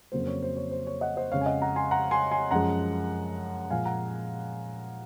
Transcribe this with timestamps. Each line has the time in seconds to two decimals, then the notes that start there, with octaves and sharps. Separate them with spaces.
0.12 F2 C#3 F#3 A#3 C5
0.27 C#5
0.42 C5
0.57 C#5
0.71 C5
0.87 C#5
1.01 D#5 F#5
1.17 C5 D#5
1.32 F2 C#3 G#3 C#5 F5
1.41 G#5
1.46 D#5 F#5
1.62 F#5 A#5
1.76 G#5 C6
1.91 F#5 A#5
2.11 G#5 C6
2.31 G#5 C6
2.51 F#2 F3 G#3 F#5 A#5
3.70 A#2 F3 G#3 F5 G#5
3.85 F#5 A#5